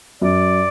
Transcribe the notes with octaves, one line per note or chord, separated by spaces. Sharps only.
F#2 D5